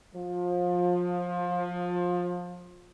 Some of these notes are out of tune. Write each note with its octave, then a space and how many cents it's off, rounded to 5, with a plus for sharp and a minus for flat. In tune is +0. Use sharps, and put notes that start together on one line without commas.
F3 +25